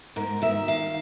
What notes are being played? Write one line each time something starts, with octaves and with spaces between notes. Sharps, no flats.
G#2 A#4
D#3 E5
D#3 F5